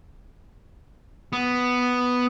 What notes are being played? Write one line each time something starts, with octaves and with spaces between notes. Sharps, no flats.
B3